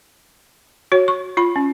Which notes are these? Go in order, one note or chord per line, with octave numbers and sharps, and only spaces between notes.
F#4 C#5
C#6
F4 B5
C#4